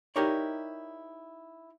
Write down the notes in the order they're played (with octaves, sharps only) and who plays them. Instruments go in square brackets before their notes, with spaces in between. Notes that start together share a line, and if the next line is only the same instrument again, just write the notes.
[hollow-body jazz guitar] D#4 E4 G4 A#4 C#5 D5